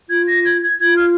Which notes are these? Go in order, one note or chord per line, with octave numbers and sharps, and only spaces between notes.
F4 G#6
A#6
G#6
G#6
F4 G#6
F6